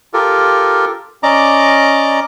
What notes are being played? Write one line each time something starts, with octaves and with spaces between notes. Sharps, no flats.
F4 G4 A4 A#4
C#4 D5 D#5 A#5 D6